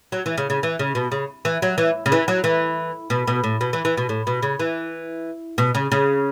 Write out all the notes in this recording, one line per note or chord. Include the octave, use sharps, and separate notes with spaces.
F#3
E3
C#3
C#3
E3
C#3
B2
C#3
E3
F#3
E3
C#3
E3
F#3
E3
B2
B2
A2
B2
E3
E3
B2
A2
B2
C#3
E3
B2
C#3
C#3